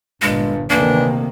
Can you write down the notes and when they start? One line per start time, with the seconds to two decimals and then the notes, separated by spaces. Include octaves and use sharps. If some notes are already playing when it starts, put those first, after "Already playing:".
0.22 G1 G2 A#2 G#3
0.70 D2 C3 D#3 E3 A#3 D4